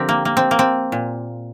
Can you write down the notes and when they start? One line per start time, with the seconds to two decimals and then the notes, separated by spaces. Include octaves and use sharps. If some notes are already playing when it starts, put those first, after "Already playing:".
Already playing: D3 F3 C4 G4 A#4
0.09 A#3
0.25 A#3
0.37 C4
0.51 A#3
0.59 C4
0.92 A#2